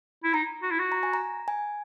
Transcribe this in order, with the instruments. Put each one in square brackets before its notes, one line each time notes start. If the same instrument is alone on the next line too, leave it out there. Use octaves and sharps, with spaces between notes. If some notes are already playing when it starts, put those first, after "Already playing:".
[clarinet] E4
[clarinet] D#4 [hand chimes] A#5
[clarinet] F#4
E4
F#4
[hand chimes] A#5
G#5
A#5
G#5